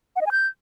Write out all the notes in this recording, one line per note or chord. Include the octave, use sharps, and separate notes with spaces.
F#5
D#5
G#5
G6